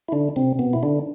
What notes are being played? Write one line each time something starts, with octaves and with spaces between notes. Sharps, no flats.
E4
D3 D4
C3 C4
B2 B3
E4
D3 D4